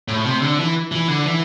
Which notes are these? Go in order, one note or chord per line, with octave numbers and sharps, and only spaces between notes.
A2
C3
D3
E3
E3
D3
E3